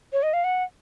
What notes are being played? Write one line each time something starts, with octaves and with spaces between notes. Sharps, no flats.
C#5
D#5
F5
F#5